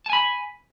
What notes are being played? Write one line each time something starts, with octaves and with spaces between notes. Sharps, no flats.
G#5 A5 B5